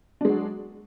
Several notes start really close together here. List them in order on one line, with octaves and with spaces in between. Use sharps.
D4 G#3 F#3